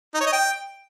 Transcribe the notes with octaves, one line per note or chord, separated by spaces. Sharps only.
D#4
C#5
D#5
G5